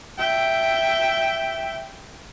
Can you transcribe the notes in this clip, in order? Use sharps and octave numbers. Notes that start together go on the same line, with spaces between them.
E5 G5